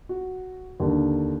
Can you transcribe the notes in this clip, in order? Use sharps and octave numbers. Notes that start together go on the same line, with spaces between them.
F#4
D#2 D3